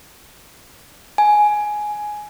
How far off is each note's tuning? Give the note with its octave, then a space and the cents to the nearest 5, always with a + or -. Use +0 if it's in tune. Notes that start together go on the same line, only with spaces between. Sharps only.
G#5 +10